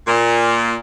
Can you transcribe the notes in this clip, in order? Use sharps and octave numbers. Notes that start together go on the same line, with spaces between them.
A#2